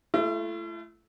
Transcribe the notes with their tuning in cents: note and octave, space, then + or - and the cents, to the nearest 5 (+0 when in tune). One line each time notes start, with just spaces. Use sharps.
A3 -20 E4 +45